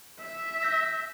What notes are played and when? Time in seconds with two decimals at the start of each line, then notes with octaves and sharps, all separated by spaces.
0.20 E5
0.61 G6 A#6 B6